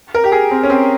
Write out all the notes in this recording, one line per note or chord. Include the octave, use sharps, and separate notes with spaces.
A#4
G4
G#4
C4
C#4
C4